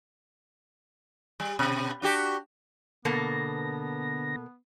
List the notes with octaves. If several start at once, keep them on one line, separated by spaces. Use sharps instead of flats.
G3
B2
D4 F#4 G4
B2 D3 A#3 B3 A4 A#6